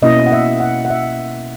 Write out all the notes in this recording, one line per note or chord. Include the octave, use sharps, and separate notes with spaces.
B2 A#3 C#4 E4 D#5
F#5
E5
F#5
F#5
E5